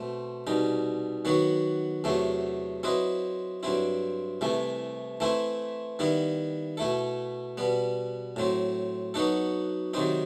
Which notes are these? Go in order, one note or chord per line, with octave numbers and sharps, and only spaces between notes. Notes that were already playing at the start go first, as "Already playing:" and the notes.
Already playing: B2 A3 C4
C2 B2 G3 D#4
D#3 F#3 B3 F#4
E2 C3 F#3 A3
F#3 C4 E4 B4 D#5
G2 F#3 C4 E4
C2 C3 E3 A3
E3 A3 C4 E4
D#3 G3 B3 E4
B2 A3 E4 A4
B2 G3 B3
A2 F#3 C4
F#3 B3 D#4 F#4 A4
C3 D#3 F#3 C4 D#4